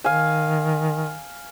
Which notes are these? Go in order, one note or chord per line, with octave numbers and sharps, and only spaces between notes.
D#3 F5 G#5